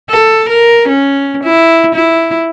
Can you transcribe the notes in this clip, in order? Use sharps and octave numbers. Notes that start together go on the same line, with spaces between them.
A4
A#4
C#4
E4
E4